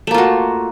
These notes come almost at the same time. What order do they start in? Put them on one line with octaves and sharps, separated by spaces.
A3 A#3 F4 F#4